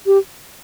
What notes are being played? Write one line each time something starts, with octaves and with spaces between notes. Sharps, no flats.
G4